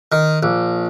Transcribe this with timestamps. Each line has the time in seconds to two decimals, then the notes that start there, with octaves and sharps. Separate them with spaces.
0.12 D#3
0.43 A#1